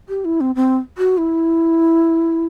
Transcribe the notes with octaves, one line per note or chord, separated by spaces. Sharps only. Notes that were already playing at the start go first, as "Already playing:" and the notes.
G4
E4
C4
C4
F#4
E4